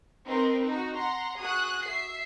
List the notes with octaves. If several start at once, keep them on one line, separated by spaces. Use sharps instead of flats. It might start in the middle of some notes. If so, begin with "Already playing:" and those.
C4 D#4 A#4 B4
D#4 F#4
F#5 A#5 C6
F#4 G#4 D#6 F#6
E5 C7